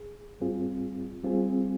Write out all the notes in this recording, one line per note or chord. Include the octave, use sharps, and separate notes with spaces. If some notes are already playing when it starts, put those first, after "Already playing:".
Already playing: G#4
G#2 G3 C4 F4 G#4
G3 C4 F4 G#4